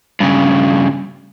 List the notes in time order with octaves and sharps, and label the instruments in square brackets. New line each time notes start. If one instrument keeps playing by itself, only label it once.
[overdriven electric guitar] G2 C#3